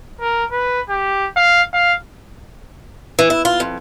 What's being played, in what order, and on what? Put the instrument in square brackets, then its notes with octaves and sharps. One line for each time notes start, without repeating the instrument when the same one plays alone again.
[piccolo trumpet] A#4
B4
G4
F5
F5
[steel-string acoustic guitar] E3
E4
F4
F2